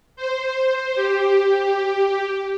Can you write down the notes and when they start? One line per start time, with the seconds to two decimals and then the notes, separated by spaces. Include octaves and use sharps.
0.16 C5
0.95 G4